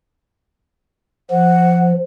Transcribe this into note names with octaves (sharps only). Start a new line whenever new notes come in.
F3 F#5